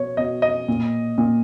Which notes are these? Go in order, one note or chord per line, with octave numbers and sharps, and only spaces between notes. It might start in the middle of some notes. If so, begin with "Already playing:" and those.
Already playing: B2 C#5
B2 D#5
D#5
A#2
A#2